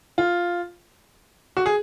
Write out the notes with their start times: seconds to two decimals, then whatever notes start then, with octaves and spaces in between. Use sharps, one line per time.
0.18 F4
1.57 F#4
1.66 G#4